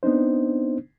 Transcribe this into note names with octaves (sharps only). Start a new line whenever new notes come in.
B3 C4 D4 D#4 C5